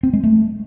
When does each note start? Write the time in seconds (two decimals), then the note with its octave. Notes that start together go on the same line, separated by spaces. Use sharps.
0.03 C4
0.13 G#3
0.23 A3